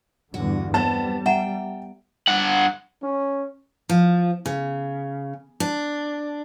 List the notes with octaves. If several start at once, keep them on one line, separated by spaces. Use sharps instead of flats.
E2 G2 D3 F#4
G3 B3 C4 A4 A5
E5 F#5 G5 A#5
G2 F#5
C#4
F3
C#3
D4